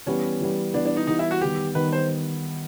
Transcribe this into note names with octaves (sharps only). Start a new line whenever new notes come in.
E3 G3 B3 C#4
E3 G3 B3
E3 G3 B3 D4
D4
D#4
E3 G3 B3 D#4
E4
F#4
D#3 G3 B3 G4
D#3 G3 B3 B4
C5